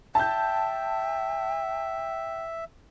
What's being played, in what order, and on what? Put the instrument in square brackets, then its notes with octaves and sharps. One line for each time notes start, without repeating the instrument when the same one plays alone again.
[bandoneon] E5 [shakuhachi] G5 [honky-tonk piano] A5 G6